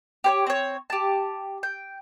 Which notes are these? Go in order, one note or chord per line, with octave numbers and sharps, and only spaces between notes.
G4 C5 C#5
C4 C#5
G4 A5
G5